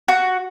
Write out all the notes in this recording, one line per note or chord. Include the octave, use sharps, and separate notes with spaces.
F#4